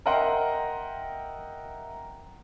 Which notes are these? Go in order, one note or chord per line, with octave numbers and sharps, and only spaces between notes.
A#4 D#5 E5 F#5 G5 C6